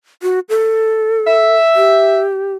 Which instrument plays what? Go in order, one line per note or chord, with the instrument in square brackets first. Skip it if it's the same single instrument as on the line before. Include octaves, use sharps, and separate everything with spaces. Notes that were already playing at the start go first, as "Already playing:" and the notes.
[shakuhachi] F#4
A4
[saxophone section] E5
[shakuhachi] G4